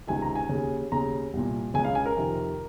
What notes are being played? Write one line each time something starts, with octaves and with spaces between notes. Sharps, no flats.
C#2 C3 D#3 G#5
A#5
G#5
D#2 C#3
D#2 C#3 A#5
C2 A#2
C#2 C#3 G#5
F5
G#5
A#4
F2 C3 D#3